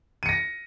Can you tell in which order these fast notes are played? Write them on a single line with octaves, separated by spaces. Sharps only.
D#7 C#7 A#6